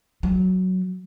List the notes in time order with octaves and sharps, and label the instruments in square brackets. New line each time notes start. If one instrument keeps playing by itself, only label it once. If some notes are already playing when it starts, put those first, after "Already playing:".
[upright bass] F#3